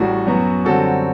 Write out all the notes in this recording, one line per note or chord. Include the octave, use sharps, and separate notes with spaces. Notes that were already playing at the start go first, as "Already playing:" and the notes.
Already playing: A1 A2 G3 F#4 A4
F#2 F#3 B3
F#2 D3 G3 C4 F#4 A4